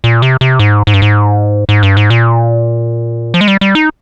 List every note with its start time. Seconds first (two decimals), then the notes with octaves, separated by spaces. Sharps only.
0.04 A#2
0.22 C3
0.41 C3
0.59 G#2
0.87 G#2
0.94 G2
1.02 G#2
1.69 G#2
1.83 G2
1.97 G#2
2.10 A#2
3.34 F3
3.41 G#3
3.48 G3
3.61 G3
3.75 D#4